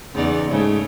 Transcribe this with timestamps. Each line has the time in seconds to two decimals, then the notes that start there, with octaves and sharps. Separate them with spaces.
0.15 E2 C#3 D#4 D5
0.51 G#2 C#3 A3